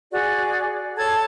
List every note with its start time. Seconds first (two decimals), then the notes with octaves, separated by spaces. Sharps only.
0.12 F#4 G#4 D5
0.97 A4 C#5 A5 G#6